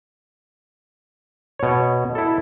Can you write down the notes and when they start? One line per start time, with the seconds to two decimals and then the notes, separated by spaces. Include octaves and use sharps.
1.59 B2 C#5
2.15 E4 A4